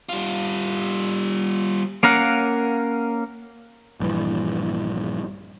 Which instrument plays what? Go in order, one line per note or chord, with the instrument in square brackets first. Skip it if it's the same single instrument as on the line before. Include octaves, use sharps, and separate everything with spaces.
[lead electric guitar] G3 F4
[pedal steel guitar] A#3 C#4 A#4 F5 F#5
[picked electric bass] A#1 G2 E3